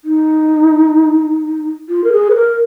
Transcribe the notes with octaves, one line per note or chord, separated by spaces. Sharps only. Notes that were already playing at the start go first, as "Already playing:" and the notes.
D#4
F4
A#4
G#4
B4
A#4